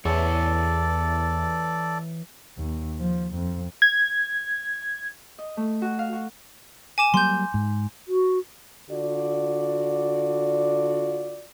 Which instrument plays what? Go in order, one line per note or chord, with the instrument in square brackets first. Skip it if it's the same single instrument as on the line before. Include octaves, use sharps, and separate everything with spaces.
[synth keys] E2 [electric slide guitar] E3 C#5 [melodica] A4 D5
[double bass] D#2
F3
F2
[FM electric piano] G#6
[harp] D#5
A3
F#4
F5
F#4
[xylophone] G#5 D6 E7
[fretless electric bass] F#3 G3 A#3 [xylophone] C6 G6
[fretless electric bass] G#2
[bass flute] F#4
[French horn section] D3 F4 F#4 D5